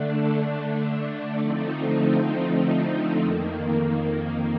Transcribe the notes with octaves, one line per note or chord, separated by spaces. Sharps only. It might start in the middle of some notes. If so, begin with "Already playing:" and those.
Already playing: D3 A3 D4
D3 F3 A3 C4 D#4
F2 D#3 A#3